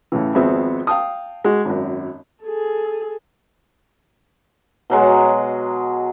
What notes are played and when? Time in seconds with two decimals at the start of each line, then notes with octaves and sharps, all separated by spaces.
0.12 A2 C#3 E3
0.35 G#1 F2 B3 C4 G#4 E5
0.87 F5 G5 A5 D#6
1.44 G#3 F#4 G#4
1.65 G#1 F#2
2.43 G#4 A4
4.90 B2 F#3 G#3